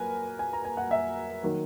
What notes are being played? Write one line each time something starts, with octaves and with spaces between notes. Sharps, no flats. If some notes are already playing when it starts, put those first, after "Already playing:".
Already playing: A#2 F#3 A#3 A#4 B4 G#5
G#5
A#5
G#5
F#5
E5
D#3 F#3 A#3